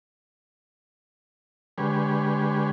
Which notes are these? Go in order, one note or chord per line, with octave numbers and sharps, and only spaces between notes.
D3 G#3 G4 G#4 B4 C#5